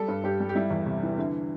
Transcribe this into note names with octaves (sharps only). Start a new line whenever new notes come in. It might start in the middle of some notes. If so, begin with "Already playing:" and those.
Already playing: G3 A4
G2
G2 G4
G3
G4
G3 E4
E2
C3
E3
D3